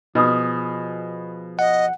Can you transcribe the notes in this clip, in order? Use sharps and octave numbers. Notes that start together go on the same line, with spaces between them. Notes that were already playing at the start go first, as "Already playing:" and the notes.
B2 F3 G#4
D#5 F#5